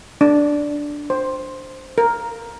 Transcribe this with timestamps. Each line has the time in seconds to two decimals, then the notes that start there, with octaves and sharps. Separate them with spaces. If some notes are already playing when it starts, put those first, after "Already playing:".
0.21 D4
1.10 C5
1.98 A#4